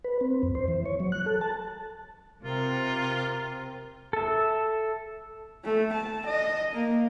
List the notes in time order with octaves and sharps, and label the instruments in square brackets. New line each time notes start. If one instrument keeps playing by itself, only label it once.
[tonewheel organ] B4
C4
F2
C5
E3
C#5
F#3
F#6
A4
A5
[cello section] C3 [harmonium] C4 A#4 [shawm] F4
[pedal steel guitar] A4 E5
[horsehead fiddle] A3
A5
D#5
A#3